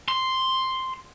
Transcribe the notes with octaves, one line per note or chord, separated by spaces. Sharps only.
C6